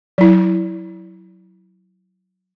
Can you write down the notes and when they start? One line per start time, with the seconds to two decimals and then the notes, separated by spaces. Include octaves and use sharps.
0.18 F#3 E4